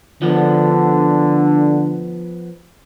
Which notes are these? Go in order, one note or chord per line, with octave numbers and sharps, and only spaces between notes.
D3 F3 B3